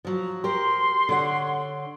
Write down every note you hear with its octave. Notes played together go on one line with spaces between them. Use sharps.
F3 F#3
G4 A#4 C5 C6
D3 C#5 F#5